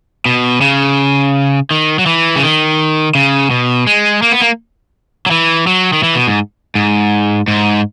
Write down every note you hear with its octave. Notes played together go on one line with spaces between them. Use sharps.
B2
C#3
D#3
F#3
E3
C#3
D#3
C#3
B2
G#3
A#3
B3
A#3
F#3
E3
F#3
D#3
E3
B2
G#2
G#2
G#2